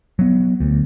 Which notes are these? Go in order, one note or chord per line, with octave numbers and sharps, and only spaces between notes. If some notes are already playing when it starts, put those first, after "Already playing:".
F#3 B3
D2